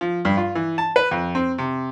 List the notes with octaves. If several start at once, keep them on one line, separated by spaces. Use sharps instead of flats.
F3
G2
F4
E3
A5
B4
F2
C4
C3